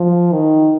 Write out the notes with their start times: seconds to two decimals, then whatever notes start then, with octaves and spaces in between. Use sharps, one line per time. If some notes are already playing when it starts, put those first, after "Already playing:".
Already playing: F3
0.32 D#3